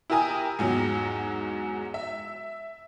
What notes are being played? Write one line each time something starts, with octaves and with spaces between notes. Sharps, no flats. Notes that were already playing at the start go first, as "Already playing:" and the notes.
E4 G4 A#4 G#5 D#6
E2 G#2 F#3
E5